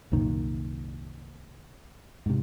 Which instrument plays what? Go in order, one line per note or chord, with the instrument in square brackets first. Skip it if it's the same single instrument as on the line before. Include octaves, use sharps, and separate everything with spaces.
[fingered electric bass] C2 F#2 A#2 D#3
G#2 C3